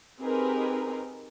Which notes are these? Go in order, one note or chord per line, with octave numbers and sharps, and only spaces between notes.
C4 D#4 G4 G#4 A#4 B4